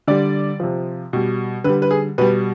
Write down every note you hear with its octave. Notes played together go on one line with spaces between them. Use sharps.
D3 G3 D5
C3 F3
B2 G3
D3 G3 B4
B4
G#4
B2 G3 B4